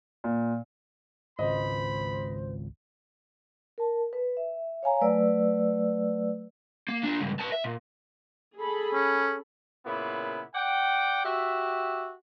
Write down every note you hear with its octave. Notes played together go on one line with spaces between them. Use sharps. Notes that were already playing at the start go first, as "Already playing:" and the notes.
A#2
G#1 C#2 C5 D#5 B5
A#4 A5
B4
E5
C#5 F5 G#5 A#5
F#3 A3 B4 D5 E6
A#3
D4 F4
C#2 G2
B4 A5
E5
A#2
G#4 A4 B5
C#4
A#2 C#3 B3 E4
D5 F#5 G5
F#4 G4 E5